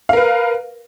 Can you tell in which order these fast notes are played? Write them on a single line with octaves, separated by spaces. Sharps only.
F5 A#4 B4